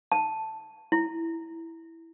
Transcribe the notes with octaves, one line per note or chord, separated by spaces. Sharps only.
A5
E4